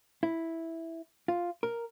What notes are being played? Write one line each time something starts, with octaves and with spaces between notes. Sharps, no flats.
E4
F4
A#4